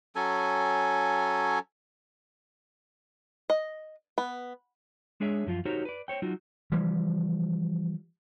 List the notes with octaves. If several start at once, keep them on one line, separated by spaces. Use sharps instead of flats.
F#3 C#4 A4 G#5
D#5
B3
G#3 D4 G#4 C#5 E5
F#2 F3 F4
D#4 F#4 G4 A#4 C5 C#5
B4 D5
C5 C#5 G5
F#3 D#4 F4 F#4
E3 F3 G3